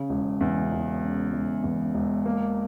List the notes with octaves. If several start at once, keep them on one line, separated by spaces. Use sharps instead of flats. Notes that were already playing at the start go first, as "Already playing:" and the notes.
Already playing: C#3
E1
E2
E1
C#3
E1
E2
E1
A#3